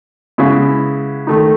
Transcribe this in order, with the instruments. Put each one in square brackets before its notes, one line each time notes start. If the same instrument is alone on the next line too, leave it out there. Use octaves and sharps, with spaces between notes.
[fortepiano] C#3 G#3 B3 E4
D#3 A3 D#4